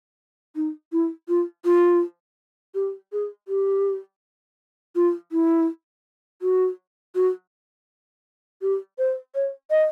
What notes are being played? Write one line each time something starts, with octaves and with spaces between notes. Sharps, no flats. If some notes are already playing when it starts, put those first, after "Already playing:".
D#4
E4
F4
F4
G4
G#4
G4
F4
E4
F#4
F#4
G4
C5
C#5
D#5